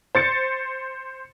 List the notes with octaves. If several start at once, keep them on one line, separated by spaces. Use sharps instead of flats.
C5 A6 C#7